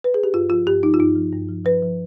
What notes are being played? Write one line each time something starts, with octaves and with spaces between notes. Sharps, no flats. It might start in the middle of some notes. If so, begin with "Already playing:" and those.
B4
G#4
G4
G2 F4
F3 F4
G2 G4
F3 D#4
F4
G2 D#4
F3
G2
F3
F3 B4
F3